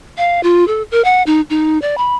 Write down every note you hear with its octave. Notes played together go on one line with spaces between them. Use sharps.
F5
F4
A4
A#4
F#5
D#4
D#4
D5
B5